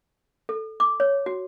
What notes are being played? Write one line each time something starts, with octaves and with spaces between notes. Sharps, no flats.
A4
D6
C#5
F#4